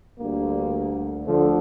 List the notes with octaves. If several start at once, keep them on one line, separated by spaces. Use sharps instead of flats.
D2 D3 G3 A#3
D2 D3 F3 A3